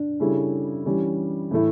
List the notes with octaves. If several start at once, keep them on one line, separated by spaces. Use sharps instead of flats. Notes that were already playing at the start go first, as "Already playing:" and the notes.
Already playing: D4
C#3 G3 C#4 E4 A4
E3 G3 C#4
A2 E3 A3 E4